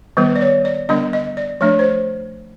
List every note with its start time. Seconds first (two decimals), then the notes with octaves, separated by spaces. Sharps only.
0.17 D#3 G3 B3 B4
0.36 D5
0.41 C#5
0.65 D5
0.89 D3 G3 B3 D4 D#5
1.13 D#5
1.37 D5
1.61 F3 A3 D4 C#5
1.79 C5